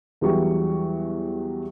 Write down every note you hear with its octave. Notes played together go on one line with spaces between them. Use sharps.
E2 E3 F#3 G3 G#4 C#6